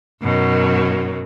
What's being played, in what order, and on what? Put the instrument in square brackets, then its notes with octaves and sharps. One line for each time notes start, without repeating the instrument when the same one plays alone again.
[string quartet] F#2 B2 D#3 F#3